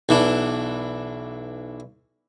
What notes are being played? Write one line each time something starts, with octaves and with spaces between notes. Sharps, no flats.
B1 E3 D4